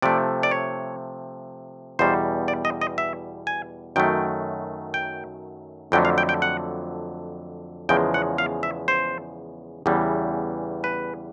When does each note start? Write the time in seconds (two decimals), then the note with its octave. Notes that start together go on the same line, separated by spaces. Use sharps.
0.02 C3 F3 A3 D5
0.43 D5
0.51 C#5
1.99 E2 B2 G3 C5
2.48 D5
2.65 D#5
2.81 D#5
2.98 E5
3.47 G#5
3.96 F#2 D#3 F#3 A3 G5
4.94 G5
5.92 F2 D3 F#3 A3 G5
6.05 F5
6.18 G5
6.29 G5
6.42 F#5
7.89 E2 C#3 F3 G#3 G5
8.14 F#5
8.38 F5
8.63 E5
8.88 C5
9.86 E2 C#3 E3 G3
10.84 B4